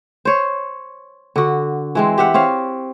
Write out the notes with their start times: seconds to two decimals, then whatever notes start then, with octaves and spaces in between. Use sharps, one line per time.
0.25 C5 C#5
1.36 D3 F#4
1.95 E3 G#3 C4
2.18 G4 E5 F#5
2.34 C4 C#5 F5